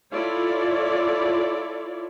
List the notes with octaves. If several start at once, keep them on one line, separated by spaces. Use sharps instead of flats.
E4 F4 A4 C#5 D5